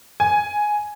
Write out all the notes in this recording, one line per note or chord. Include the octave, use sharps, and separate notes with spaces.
G#5